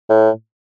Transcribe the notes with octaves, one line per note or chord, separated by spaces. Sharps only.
A2